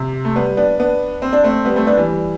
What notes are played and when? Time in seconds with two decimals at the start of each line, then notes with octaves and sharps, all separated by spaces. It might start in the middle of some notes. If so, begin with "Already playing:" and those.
Already playing: C3
0.25 A3
0.36 G3 B3
0.57 B3 D4
0.79 B3 D4
1.22 C4
1.33 D4
1.44 A3 C4
1.65 G3 B3
1.76 A3 C4
1.87 B3 D4
1.97 E3 G3